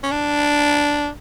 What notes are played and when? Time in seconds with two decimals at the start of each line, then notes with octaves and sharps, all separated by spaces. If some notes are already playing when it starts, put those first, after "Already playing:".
0.03 C#4
0.11 D4